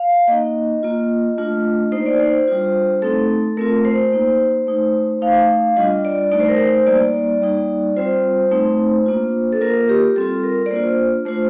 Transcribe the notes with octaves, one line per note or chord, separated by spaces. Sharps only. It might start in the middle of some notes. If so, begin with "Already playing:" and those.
Already playing: F5
A#3 D#4 D#5
A#3 F4
A3 D4 F4
A#3 D#4 C5
D5
C5
G3 D4 F4
A3 C4 D#4 A4
A3 C4 F4 A#4
C5
A#3 D#4
A3 D#4
A3 D#4 F5
G3 D4 F4 D#5
D5
A3 D#4 D5
C5
A#4
C5
G3 A#3 D#4 D5
G3 A#3 D#4
G3 C4 F4 C5
A3 C4 D#4
A#3 D4 F4
A4
A#3 F4 A#4
G4
G3 C4 F4 A4
A#4
D5
A#3 D4 F4 C5
A3 D4 F4 C5